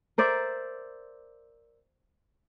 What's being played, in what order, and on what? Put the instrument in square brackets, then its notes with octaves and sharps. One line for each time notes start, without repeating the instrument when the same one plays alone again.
[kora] A#4 C5 D5 E5